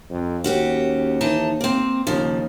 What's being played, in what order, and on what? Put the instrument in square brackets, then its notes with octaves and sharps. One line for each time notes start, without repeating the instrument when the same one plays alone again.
[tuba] F2
[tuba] D#2 [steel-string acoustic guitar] C#4 F#4 G4
[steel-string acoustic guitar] E3 D#4 A5
A#3 C4
[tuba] D#2 [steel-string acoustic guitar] C#3 F3